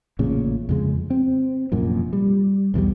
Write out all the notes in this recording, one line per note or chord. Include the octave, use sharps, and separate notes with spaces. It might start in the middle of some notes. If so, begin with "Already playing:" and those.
A1 A#2 C#3
F2 C#3 G#3
C4
F1 A#1 F#2 A#2
G3
B1 E2 E3 G3